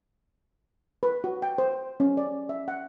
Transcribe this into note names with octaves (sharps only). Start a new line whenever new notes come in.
B4
F#4
G5
C5
C#4
D5
E5
F#5